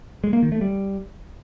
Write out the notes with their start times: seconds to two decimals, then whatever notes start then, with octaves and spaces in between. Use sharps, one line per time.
0.24 G#3
0.33 A#3
0.42 D#3
0.52 A3
0.61 G3